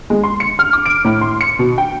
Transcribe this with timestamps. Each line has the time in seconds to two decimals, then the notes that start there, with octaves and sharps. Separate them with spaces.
0.10 G#3
0.24 C6
0.40 C#7
0.59 F6
0.73 D6
0.86 D7
1.05 A2
1.21 C6
1.41 C#7
1.59 B2
1.78 G5